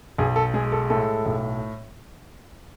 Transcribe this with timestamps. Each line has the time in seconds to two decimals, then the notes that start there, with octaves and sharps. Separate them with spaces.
0.18 B1 G#4
0.36 A4
0.54 G#3 G#4
0.72 A4
0.90 A2 A4
1.26 B1